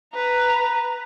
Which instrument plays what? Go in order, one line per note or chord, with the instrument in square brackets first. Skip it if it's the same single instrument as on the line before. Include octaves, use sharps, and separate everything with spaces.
[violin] B4 A#5